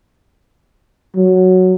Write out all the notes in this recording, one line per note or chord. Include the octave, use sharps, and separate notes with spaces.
F#3